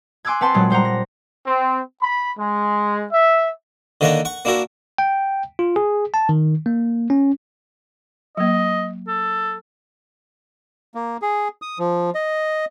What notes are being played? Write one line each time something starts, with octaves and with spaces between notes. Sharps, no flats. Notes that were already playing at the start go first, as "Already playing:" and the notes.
G#5 C6 D6 E6 F#6 G#6
C4 B4 F#5 A5 C6
A#2 F#3 G#3 F#6
G3 C5 F#5 A#5
A#6
C4
B5
G#3
E5
D3 D#3 A#3 C#5 F#5 A#5
F#5 C#6
A#3 D4 E4 F#4 A#4
G5
F4
G#4
A5
D#3
A#3
C#4
F#3 A#3 D#5
A4
A#3
G#4
D#6
F3
D#5